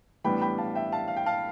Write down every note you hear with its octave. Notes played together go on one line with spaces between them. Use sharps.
A2 E3 G3 B3 D4 G5 B5
G5 B5
F5 A5
E5 G5
F5 A5
F5
G5
F5 A5